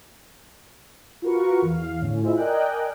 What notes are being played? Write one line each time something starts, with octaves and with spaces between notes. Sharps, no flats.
F4 F#4 A#4 B4 C#6
E2 F5
A2 D3 C#4
E4 F4 G#4 C5 D#5 E5
A#4 D5 D#5 G5 G#5 F#6